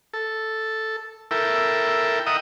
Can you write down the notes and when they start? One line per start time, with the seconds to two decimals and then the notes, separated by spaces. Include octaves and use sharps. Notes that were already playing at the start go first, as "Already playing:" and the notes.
0.13 A4
1.31 E4 A4 A#4 E5 G5
2.26 D#5 E5 F#5 G5 A#5 D#6